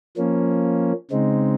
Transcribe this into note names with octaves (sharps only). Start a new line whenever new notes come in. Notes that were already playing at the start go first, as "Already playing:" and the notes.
F3 A#3 C#4
C#3 G#3 C4 D#4